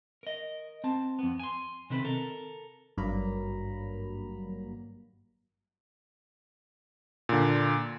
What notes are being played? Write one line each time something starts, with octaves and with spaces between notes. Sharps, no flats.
A#4 D#5
C4 A5
F2 B3
G#5 C6
C3 D#3 C4 A4 B4
A4 A#4
G#1 G2 F#3 A#3 A#5 B5
A#2 D3